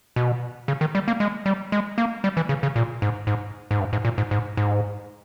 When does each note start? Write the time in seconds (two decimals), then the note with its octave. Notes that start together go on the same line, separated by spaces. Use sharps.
0.16 B2
0.68 C#3
0.81 D#3
0.95 G3
1.08 A#3
1.20 G#3
1.46 G3
1.72 G#3
1.98 A#3
2.24 G3
2.37 E3
2.49 C#3
2.63 C#3
2.76 A#2
3.02 G#2
3.27 G#2
3.71 G#2
3.80 G2
3.93 G#2
4.05 A#2
4.18 G#2
4.31 G#2
4.57 G#2